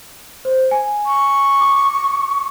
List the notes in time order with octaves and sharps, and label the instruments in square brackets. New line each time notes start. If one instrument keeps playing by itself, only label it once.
[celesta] C5
G#5
[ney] C#6
[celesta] D6